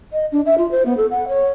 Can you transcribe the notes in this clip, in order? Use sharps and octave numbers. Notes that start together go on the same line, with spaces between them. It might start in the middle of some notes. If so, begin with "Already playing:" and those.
D#5
D4
E5
F4
C5
B3
A4
F#5
C#5